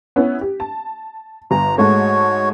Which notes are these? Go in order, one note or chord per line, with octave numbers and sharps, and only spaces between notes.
B3 C#4 E4
G4
A5
G1 A#5
G#2 G#3 A3 F#4 C#5